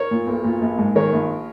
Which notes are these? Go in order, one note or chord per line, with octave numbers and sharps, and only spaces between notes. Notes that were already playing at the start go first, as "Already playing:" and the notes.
Already playing: A#4 C#5
A#2
B1
A#2
A#1
G#2
D#3 A#4 C#5
A#1